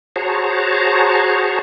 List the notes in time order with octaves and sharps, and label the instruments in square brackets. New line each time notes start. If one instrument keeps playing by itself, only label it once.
[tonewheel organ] F#4 G#4 C5 C#5 A5 A#5